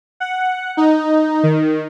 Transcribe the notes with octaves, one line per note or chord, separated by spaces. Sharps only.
F#5
D#4
D#3